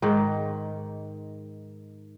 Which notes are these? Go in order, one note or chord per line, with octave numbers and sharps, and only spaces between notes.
G#2 D#3